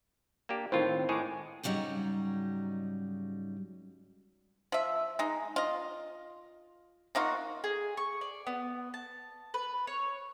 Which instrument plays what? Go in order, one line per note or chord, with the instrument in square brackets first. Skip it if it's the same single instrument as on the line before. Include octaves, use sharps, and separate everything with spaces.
[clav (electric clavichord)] A#3 D4 G4
[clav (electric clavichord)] A2 F4 [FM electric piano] D#3 C4
[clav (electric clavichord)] A2 G#3 G#4 [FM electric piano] C#6 D6
[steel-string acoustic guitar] G#2 C#3 F#3 G3 D#4
[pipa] F3 E5
G#3 D#4
F4 D#5
A#3 D#4 F4 F#4
[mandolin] G#4
C#6
D5
B3
A5
B4
C#5